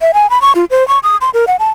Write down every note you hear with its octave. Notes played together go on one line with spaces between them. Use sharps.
E5
G#5
B5
C#6
F4
C5
C#6
D#6
C6
A#4
F#5
A5